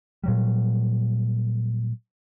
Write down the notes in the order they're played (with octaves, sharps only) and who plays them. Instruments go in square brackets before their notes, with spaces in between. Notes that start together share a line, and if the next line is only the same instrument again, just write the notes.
[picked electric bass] A#2 F#3 G3